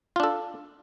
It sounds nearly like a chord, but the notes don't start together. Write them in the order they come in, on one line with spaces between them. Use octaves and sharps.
F4 D4 A4